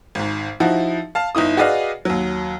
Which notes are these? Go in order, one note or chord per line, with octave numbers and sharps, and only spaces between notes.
G#1 G#2
F3 D#4 E4 F#4
F5 A5
G1 D#4 E4 D#6
F#4 G#4 B4 D5 D#5 F5
D#2 F#3